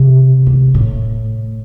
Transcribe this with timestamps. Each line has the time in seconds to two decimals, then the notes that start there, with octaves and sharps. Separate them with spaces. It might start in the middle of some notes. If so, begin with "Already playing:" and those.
Already playing: C3
0.46 C3
0.74 A2